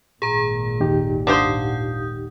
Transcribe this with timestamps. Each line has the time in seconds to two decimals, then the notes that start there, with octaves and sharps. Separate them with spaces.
0.22 G#1 A#2 G#4 A#5
0.80 D#2 D#4 G4
1.27 D4 F4 C5 F#5 D#6 G6